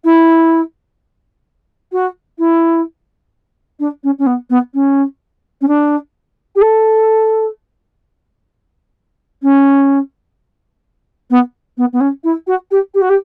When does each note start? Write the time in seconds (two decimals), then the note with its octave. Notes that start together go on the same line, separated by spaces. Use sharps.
0.04 E4
1.92 F#4
2.38 E4
3.79 D4
4.03 C#4
4.18 C#4
4.26 B3
4.50 B3
4.74 C#4
5.61 C#4
5.67 D4
6.55 G4
6.61 A4
9.42 C#4
11.30 B3
11.77 B3
11.92 B3
12.00 C#4
12.23 E4
12.47 F#4
12.71 G4
12.94 G4
13.01 F#4
13.09 G4